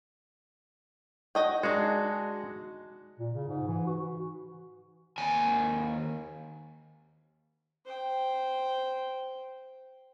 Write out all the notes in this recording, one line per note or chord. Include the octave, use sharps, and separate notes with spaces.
F#4 D#5 G5
G#3 D4 D#4 F#4 G#4
A#2
C#3
G#2
E3
F#4
D#2 G#5
C5 G5